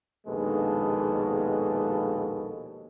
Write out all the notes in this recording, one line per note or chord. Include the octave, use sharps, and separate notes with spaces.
A#1 D#2 B2 G#3 A4